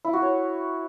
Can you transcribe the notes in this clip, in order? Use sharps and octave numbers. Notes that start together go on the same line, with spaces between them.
E4
F#4
C#5